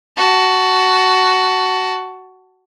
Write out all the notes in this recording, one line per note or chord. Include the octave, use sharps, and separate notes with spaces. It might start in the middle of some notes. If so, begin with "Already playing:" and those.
F#4 A5